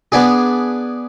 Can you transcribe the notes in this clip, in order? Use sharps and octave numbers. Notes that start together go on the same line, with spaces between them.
B3 D4 G#4